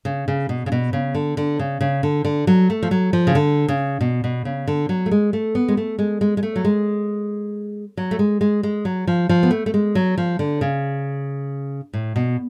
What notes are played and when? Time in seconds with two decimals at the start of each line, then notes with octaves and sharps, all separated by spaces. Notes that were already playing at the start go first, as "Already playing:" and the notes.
0.05 C#3
0.28 C#3
0.49 B2
0.66 C#3
0.72 B2
0.93 C#3
1.15 D3
1.37 D3
1.59 C#3
1.81 C#3
2.03 D3
2.25 D3
2.47 F#3
2.70 A3
2.82 F3
2.91 F#3
3.13 F3
3.27 C#3
3.35 D3
3.68 C#3
4.01 B2
4.24 B2
4.45 C#3
4.67 D3
4.89 F#3
5.06 A3
5.11 G#3
5.33 A3
5.55 B3
5.68 G#3
5.77 A3
5.99 G#3
6.21 G#3
6.37 G#3
6.43 A3
6.56 F#3
6.65 G#3
7.97 F#3
8.11 A3
8.19 G#3
8.41 G#3
8.63 G#3
8.85 F#3
9.07 F3
9.29 F3
9.43 B3
9.51 A3
9.66 A3
9.74 G#3
9.95 F#3
10.18 F3
10.39 D3
10.61 C#3
11.93 A2
12.16 B2